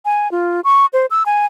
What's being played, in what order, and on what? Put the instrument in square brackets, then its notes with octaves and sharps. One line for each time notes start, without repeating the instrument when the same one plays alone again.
[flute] G#5
F4
C#6
C5
E6
G#5